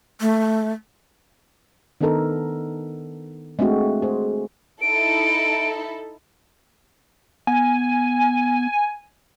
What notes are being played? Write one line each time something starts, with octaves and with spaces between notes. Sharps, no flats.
A3
D#3 B3 D4 D#4 A4 A#4
G#3 A3 C4 D4 F#4
G#4 C5
D#4 E4 A4 D7
B3 G#5